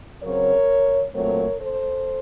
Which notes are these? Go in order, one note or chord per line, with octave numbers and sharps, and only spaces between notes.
C#3 F#3 C4 A#4 C#5
A#2 F#3 A3 C4 A#4 C#5
A4 C5